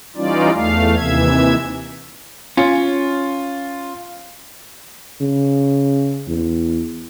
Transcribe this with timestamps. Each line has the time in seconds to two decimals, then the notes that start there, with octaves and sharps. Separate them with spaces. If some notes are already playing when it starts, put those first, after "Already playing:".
0.16 E3 G3 C#4 D#4 F4 D5
0.55 E2 A3 F5
0.96 D#2 C3 E3 E5 G#6
2.57 C#4 F4
5.21 C#3
6.28 E2